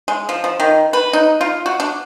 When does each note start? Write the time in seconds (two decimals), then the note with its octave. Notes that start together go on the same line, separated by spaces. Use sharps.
0.08 G#3
0.29 F3
0.44 F3
0.60 D#3
0.93 B4
1.13 D#4
1.41 F4
1.66 F#4
1.80 D4